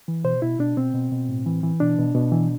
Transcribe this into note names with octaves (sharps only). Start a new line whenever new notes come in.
E3
B2 C5
B2 E4
B2 D4
B2 C4
B2
B2
A2
E3
E3
B2 D4
B2
B2
E3